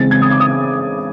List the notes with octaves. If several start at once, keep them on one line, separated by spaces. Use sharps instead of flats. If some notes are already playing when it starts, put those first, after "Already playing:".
Already playing: C#3 E3 G#3 C4 A6
G#6
D#6
D6
D#6